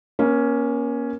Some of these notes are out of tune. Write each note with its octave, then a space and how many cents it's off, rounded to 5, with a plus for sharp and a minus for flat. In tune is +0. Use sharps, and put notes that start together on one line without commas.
A#3 +30 C#4 +0